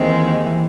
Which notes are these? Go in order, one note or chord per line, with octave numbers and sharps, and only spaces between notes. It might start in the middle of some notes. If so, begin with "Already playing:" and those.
Already playing: D#2 D#3 E3 G#3 C4
E3